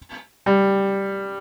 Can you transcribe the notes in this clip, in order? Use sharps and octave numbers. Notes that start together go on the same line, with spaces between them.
G3